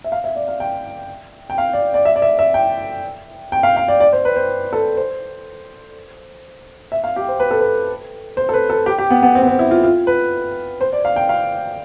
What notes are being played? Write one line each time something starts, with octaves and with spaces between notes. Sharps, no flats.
E5
F5
E5
D5
F5
G5
G5
F5
D5
D5
E5
D5
E5
E5
G5
G5
F5
F5
D5
D5
C5
B4
C5
A4
C5
E5
F5
G4
C5
B4
A4
B4
C5
A4
B4
A4
G4
G4
B3
B3
C4
B3
C4
E4
F4
F4
B4
C5
D5
F5
G5
F5